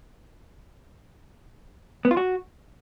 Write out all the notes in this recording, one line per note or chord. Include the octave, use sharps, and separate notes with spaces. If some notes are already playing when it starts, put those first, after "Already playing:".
B3
F4
F#4